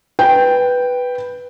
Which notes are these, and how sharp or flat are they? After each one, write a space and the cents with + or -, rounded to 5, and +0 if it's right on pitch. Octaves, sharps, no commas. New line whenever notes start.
B4 +0 G5 +0